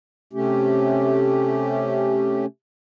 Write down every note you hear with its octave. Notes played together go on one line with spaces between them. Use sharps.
C3 A3 C#4 G4